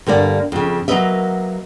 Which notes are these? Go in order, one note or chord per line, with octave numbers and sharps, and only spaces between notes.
G2 D3 A#3 D5
F2 C#3
F#3 A#3 A#4 B4 D#5 E5